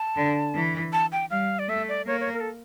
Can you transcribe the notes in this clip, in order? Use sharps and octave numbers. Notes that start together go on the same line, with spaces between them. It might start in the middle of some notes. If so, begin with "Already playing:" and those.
Already playing: A5
D3
E3
A5
G5
G3 F5
D5
A3 E5
D5
A#3 C#5
C#5
A#4
A4